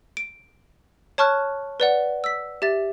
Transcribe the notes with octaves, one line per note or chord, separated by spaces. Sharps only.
D7
C#5 A5 C#6 F6 F#6
B4 D5 F#5
E6 B6
G4 E5 A6